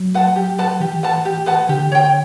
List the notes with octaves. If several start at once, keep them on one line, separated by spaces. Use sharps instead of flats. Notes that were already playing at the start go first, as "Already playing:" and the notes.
Already playing: F#3
B4 F#5 A5
G4
B4 F#5 A5
E3 G4
B4 F#5 A5
G4
B4 F#5 A5
D3 G4
C#5 G5